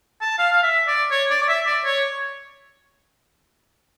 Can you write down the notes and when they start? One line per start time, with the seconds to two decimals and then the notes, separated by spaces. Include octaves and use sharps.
0.21 A5
0.38 F5
0.52 F5
0.63 E5
0.87 D5
1.11 C#5
1.30 D5
1.42 D5
1.48 E5
1.66 D5
1.85 C#5